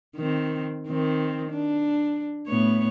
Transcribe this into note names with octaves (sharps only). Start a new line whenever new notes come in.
D#3 C4
D#3 C4
D4
A2 B3 C#5